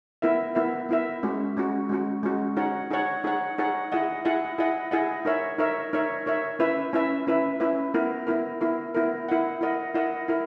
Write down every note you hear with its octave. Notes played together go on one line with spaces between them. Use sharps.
B3 E4 A#4 E5
B3 E4 A#4 E5
B3 E4 A#4 E5
G#3 C#4 F#4
G#3 C#4 F#4
G#3 C#4 F#4
G#3 C#4 F#4
D#4 G#4 C#5 F#5
D#4 G#4 C#5 F#5
D#4 G#4 C#5 F#5
D#4 G#4 C#5 F#5
E4 G#4 D#5 F#5
E4 G#4 D#5 F#5
E4 G#4 D#5 F#5
E4 G#4 D#5 F#5
D#4 A#4 C#5 E5
D#4 A#4 C#5 E5
D#4 A#4 C#5 E5
D#4 A#4 C#5 E5
C#4 E4 B4 E5
C#4 E4 B4 E5
C#4 E4 B4 E5
C#4 E4 B4 E5
B3 E4 A#4
B3 E4 A#4
B3 E4 A#4
B3 E4 A#4
E4 A#4 D#5 F#5
E4 A#4 D#5 F#5
E4 A#4 D#5 F#5
E4 A#4